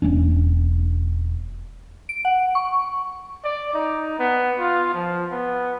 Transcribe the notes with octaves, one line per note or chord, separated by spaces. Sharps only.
E1 A#3 C#4 D4
D7
F#5
C#6
D5
D#4
B3
F4
F3
B3